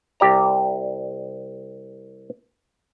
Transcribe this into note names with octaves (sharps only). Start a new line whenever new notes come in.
C2 G4 D5 A#5